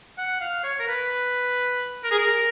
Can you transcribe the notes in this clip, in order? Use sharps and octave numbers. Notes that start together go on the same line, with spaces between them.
F#5
F5
C#5
A#4
B4
A#4
G#4
A#4